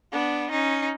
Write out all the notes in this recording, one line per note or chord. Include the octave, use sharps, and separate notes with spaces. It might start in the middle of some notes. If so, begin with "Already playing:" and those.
B3 D4
C#4 D#4